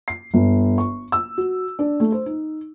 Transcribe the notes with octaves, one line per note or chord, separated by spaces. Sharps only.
C7
G1
C#6
E6
F#4
D4
A3
C5
D#4